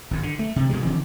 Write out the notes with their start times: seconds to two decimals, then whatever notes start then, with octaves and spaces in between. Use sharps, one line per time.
0.11 G#1 G#2
0.23 D3
0.39 A3
0.56 C3
0.70 B2 D3 G#3
0.85 C#3 E3 F3 C4